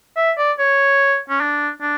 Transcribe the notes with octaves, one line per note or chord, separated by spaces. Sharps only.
E5
D5
C#5
C#4
D4
D4